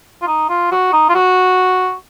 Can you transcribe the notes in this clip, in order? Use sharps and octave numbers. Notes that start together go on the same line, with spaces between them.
F4
D#4
F4
F#4
D#4
F4
F#4